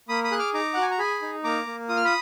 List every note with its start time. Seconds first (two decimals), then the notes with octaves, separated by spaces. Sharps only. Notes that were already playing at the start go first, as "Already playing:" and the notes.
0.09 A#3 B5 D#6
0.24 B5 D#6
0.32 G#4 F#6
0.39 D6 F6
0.54 D#4 A#5 D6
0.74 F#4 F#5
0.82 G#5
0.91 A#5
0.99 G#4 G#5 B5
1.22 D#4
1.44 A#3 A#5 D6
1.67 A#3
1.89 F4 D#6
1.97 F6
2.05 B5 D#6